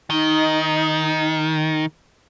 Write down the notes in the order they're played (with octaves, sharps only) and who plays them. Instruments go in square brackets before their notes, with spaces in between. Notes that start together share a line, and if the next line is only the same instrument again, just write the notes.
[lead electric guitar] D#3 [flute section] D#4